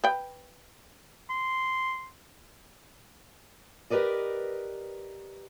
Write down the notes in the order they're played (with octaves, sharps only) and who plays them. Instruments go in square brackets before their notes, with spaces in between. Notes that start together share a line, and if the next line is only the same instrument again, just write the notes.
[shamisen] B4 G5
[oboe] C6
[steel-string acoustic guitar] G4 A#4 B4 D5 D#5